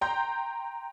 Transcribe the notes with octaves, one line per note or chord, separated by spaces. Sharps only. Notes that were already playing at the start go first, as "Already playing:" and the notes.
G5 A#5 C6 G6